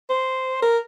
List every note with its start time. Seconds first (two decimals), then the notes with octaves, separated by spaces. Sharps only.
0.10 C5
0.62 A#4